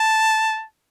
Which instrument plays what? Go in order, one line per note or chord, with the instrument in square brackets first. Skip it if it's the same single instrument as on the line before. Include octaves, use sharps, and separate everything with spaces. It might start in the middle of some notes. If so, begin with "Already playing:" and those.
Already playing: [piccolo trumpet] A5